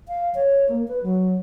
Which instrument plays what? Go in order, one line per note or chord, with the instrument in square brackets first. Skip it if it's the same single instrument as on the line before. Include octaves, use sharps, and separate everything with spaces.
[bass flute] F5
C#5
A#3
B4
F#3